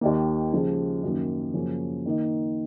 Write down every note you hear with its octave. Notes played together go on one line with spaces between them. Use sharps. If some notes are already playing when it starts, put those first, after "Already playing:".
D#2 D#3 A#3
C#3 F3 G#3
F#2 D#3 A#3
F#2 C#3 F3 A#3 C#4
D#3 A#3 D#4